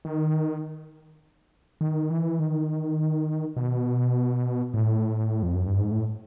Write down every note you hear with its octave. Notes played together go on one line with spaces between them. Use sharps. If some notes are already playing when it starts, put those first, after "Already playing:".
D#3
D#3
E3
D#3
B2
A2
F2
F#2
G2
G#2
A2